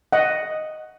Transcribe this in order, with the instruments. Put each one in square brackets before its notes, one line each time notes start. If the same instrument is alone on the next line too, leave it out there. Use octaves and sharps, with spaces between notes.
[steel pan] D#5 F#5